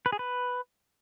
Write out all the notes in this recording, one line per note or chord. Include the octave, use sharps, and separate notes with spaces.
B4
G#4
B4